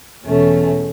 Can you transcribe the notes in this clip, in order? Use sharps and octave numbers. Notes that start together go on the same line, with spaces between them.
E2 B2 A3 C#4